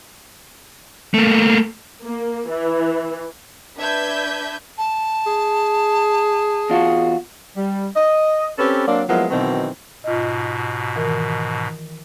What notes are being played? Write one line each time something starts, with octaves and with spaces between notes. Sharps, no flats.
A3 A#3
A#3
E3
D4 B4 E5 G6 G#6 B6
A5
G#4
E2 F4 F#4
G3
D#5
C4 C#4 G4 A4 B4
F#3 A#3 C4 D4
F3 F#3 G#3 A#3 B3 E4
B2 D#3 E3 F#3 C4
G#2 B2 F4 D#5
D#3 E3 A#4